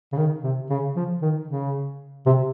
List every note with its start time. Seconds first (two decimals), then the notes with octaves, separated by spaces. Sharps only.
0.12 C#3
0.17 D#3
0.44 C3
0.70 C#3
0.96 F3
1.21 D#3
1.48 C#3
2.26 C3